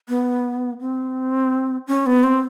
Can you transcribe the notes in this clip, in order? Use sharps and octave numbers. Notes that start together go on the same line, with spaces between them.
B3
C4
C#4
B3
C4